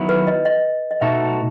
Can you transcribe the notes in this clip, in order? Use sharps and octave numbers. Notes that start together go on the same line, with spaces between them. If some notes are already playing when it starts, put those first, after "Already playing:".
Already playing: D#3 F#3 B3 E4
B4
D#5
D#5
D#5
B2 A3 D#4 F#4 A4 E5